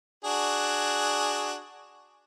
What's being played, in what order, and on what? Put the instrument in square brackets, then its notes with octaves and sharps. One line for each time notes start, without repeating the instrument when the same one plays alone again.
[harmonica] D4 F#4 G#4